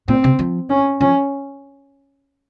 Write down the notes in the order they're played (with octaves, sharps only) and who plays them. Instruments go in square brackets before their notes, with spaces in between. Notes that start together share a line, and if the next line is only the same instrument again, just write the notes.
[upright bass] A#2 [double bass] C4
[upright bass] C3
F3
[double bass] C#4
[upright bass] F3 [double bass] C#4